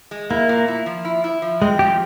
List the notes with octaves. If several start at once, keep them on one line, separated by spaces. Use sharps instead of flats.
G#3
A#3 E4
A#2
E4
F3
E4
E4
F3
G#3 C4
F3 G4